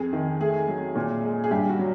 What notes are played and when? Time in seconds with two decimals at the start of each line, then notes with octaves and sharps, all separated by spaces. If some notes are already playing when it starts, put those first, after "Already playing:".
Already playing: F2 G#4
0.13 D#3
0.41 A3 G#4
0.68 F#3
0.96 A#2
1.23 G#3
1.44 G#4
1.51 G2 G4
1.69 F#4
1.79 F#3